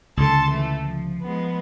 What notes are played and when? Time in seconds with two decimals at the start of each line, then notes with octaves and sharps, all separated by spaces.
0.17 C#2 D3 A4 A5 C6
0.50 E3 A3
0.81 F3
1.23 F3 G#3 B3